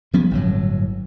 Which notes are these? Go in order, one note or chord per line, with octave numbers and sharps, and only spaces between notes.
F3 G3 B3 C#4
G1 A2 F#3